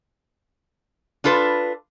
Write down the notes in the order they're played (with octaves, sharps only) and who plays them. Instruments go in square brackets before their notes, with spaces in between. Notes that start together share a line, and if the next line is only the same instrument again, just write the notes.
[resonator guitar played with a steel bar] D4 F4 A4 B4